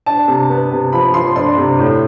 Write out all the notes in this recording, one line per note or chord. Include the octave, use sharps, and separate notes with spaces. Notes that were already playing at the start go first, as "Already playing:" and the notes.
D4 A5
C3
B3
C3
F3 B5
F3 C6
D4 C6
C3
A2